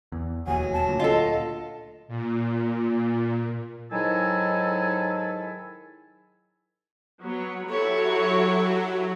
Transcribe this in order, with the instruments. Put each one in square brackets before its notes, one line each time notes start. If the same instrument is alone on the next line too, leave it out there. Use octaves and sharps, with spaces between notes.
[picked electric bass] E2
[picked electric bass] E1 D#2 [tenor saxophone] F#3 [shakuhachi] G#5
[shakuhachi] A5
[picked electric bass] D2 A#2
[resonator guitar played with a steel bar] F4 A4 [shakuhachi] D#5
[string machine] A#2
[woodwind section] G#2 D#3 F#3 E4 A4 G#5
[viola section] F#3 B3 C#5
[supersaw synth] F#3 [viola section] E4 G4 A4 [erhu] C#5